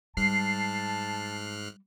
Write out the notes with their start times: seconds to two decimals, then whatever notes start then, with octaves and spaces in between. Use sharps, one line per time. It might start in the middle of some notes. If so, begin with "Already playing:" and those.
0.17 G#2 G3 A5 F6 F#6 C7